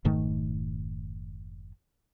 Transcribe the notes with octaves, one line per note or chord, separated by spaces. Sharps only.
F1 G#2 D#3 A3